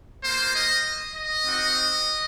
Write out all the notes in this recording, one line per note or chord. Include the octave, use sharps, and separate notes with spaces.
A#3 F4 C5
D#5
D#5
C4 D#4 F#4